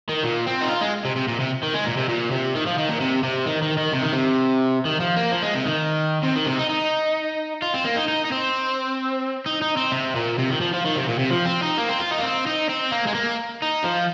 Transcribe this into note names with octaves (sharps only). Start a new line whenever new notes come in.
D#3
A#2
C4
D#4
F4
G#3
C3
C3
A#2
C3
D#3
G#3
A#2
C3
A#2
C3
D#3
F3
D#3
A#2
C3
C3
D#3
D#3
D#3
C3
D#3
C3
D#3
F3
A#3
F3
G#3
C3
D#3
C3
D#3
C3
D#4
D#4
F4
C4
A#3
D#4
D#4
D#4
C4
D#4
D#4
C4
C3
A#2
C3
D#3
F3
F3
D#3
C3
A#2
C3
F3
C4
D#4
A#3
C4
F4
D#4
A#3
C4
D#4
C4
A#3
G#3
A#3
D#4
F3